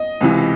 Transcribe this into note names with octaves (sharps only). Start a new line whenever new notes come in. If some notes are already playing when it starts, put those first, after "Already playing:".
Already playing: D#5
C#2 C3 E3